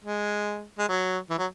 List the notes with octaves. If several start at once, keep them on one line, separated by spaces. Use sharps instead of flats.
G#3
G#3
F#3
E3
F#3